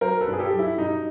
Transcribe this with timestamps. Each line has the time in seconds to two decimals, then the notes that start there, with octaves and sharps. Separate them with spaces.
0.01 F#3 A#4 C5
0.21 A4 B4
0.27 G2
0.33 G#4
0.39 G4 A4
0.52 F#3
0.59 E4
0.78 G2 D#4